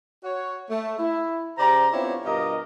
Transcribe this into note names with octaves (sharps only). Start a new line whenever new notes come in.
F#4 C#5
A3
E4
C#3 G4 C5 D5 A#5
B3 C4 D4 E4 F4 C#5
G2 B2 F4 G4 A#4 D#5